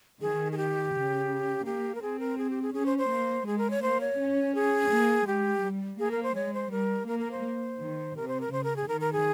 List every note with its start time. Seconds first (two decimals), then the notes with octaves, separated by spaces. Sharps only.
0.21 D#3 G#4
0.52 G#4
0.57 G4
0.94 C#3
1.66 A#3 G4
1.95 A#4
2.02 C4 G#4
2.20 A#4
2.38 G#4
2.50 G4
2.62 G#4
2.74 C#4 G#4
2.86 C5
2.98 C5
3.10 A#3
3.46 G#3 G#4
3.58 A#4
3.70 C#5
3.82 A#3 C5
4.01 C#5
4.19 C#4
4.55 G#4
4.91 A#3
5.27 G#3 G4
5.63 G3
5.99 A#3 G#4
6.11 A#4
6.23 C5
6.35 G#3 C#5
6.54 C5
6.71 G3 A#4
7.08 A#3 A#4
7.19 A#4
7.31 C5
7.80 D#3
8.16 C3 A#4
8.28 C5
8.41 A#4
8.52 C#3 C5
8.64 A#4
8.76 G#4
8.88 D#3 A#4
9.01 A#4
9.13 G#4